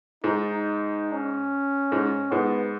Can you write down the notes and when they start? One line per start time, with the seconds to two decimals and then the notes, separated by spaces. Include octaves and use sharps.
0.24 G#2 D#4
0.53 D#4
1.13 C#4
1.92 G#2
2.31 G#2 B3